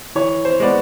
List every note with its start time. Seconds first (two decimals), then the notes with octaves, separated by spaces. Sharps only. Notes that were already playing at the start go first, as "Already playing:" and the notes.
0.15 E3 C#5
0.45 C5
0.60 G#3 B3 D5